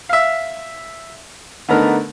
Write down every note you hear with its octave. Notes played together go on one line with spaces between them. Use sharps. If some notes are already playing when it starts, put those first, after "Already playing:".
E5 F5
D3 A3 B3 D#4 A#4